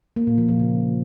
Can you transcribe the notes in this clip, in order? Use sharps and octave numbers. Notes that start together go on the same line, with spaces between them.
A#3
A#2
F3
F3
C#3